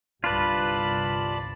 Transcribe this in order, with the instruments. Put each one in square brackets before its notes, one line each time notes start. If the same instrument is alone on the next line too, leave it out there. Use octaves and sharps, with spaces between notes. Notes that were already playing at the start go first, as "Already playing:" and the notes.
[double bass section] G1 C2 G2 [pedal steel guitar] F4 B4 [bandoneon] D5 A5 B5